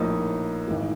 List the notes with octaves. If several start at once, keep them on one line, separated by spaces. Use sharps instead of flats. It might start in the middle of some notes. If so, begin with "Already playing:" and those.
Already playing: A#1 A2 F3 A#3 D#4
G#1 G#2 E3